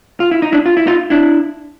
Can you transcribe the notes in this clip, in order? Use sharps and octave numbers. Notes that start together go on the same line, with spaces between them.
F4
E4
D#4
D4 E4
F4
E4
D#4 F4
D4 E4